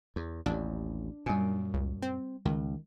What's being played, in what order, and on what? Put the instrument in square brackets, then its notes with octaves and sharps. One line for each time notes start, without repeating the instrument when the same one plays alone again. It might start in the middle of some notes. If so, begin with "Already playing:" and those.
[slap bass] E2
[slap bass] A1 D#2 [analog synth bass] D4
[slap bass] F#2 A#2 [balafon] G3 G#5
[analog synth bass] C#2
C4
[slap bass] C#2 [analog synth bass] D#3